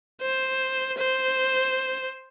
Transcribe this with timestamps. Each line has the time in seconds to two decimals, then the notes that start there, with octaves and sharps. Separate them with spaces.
0.22 C5
0.98 C5